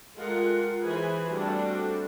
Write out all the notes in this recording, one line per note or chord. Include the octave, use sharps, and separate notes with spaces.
G#3 F4 G4 A4 A#4 F#5
E3 G#4 B4 C5 G#5 B5
G3 A3 C4 D4 F#4 A4